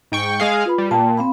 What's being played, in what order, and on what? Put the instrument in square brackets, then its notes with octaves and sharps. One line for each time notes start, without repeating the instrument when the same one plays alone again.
[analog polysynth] G#2 G5 C#6
G#3 G#4 F5
[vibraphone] F4 B4 B5
[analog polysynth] G3
[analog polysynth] A#2 [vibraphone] G5 A5
[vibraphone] C4 F5 B5